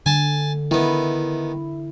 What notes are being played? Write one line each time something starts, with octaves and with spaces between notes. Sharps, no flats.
D3 G#5 A5
D#3 B3 E4